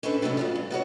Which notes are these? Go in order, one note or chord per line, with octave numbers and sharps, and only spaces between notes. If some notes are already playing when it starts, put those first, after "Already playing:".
C#4 D4 A4 B4 C5
C3 F#3 A3 B3 C#4
F2 F3 D4
G2
B3 F#4 G#4 C#5